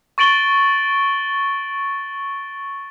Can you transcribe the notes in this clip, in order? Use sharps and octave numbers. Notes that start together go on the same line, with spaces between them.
C#6 A6 D7 F#7 G7